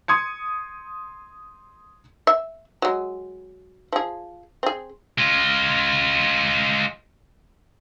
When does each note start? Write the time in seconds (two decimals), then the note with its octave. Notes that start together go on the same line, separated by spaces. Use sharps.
0.08 C6 D#6 G#6 C#7
2.27 E5
2.82 F#3 G#3
3.93 F3 G#4
4.63 C4 G#4
5.18 G#3 F4